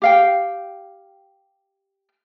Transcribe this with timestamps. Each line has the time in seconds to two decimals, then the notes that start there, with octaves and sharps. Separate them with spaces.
0.02 G4 F5 G5